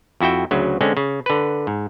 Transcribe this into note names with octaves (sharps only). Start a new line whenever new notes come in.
F2 E4 F#4 E5 G5
D2 C#3 F#3
D3 G#3 C4 C#4
C#3
D3 B4
G#2